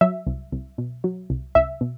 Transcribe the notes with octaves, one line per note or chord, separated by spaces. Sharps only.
F#3 E5
C2
C2
B2
F#3
C2
C2 E5
B2